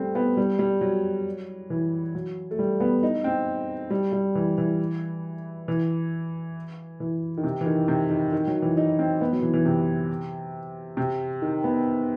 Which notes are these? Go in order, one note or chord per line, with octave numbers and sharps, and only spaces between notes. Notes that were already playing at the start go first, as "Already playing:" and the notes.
Already playing: G3 A3 C4
B3
G3
G3
F#3
E3
F#3
A3
G3
B3
D#4
C4
G3
G3
E3
E3
E3
E3
D#3
C3
E3
D#3
C3
D#3
D#3
F#3
E3
D#4
C4
B3
F#3
E3
E3
C3
C3
D#3
B3